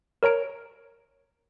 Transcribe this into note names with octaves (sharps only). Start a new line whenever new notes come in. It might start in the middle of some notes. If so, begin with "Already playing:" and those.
A#4 C#5 A#5 D7